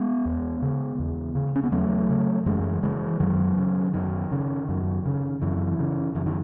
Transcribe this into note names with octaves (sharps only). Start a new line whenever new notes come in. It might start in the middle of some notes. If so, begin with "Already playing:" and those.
Already playing: G#3 B3
E2
C#3
E2
C#3
C#4
B3
E2 F#3 A3
C#3
F#2 E3 G#3
C#3 E3 G#3
F#2 D#3 F#3
C#3
F#2 D#3
C#3
F#2
C#3
F#2 E3
C#3
F#2 E3
D#3